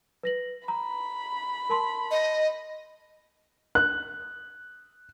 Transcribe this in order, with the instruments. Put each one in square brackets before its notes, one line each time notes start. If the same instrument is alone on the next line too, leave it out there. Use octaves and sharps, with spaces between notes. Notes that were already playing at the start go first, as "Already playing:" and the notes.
[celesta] B4 A#6 F#7
[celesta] A#5 [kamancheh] B5
[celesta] A#4 A5 C6
[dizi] D#5
[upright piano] F#6